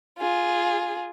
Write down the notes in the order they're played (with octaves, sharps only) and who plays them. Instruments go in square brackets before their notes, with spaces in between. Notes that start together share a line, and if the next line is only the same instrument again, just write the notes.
[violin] F4 G#4